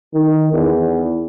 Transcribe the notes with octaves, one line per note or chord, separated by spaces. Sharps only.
D#3
E2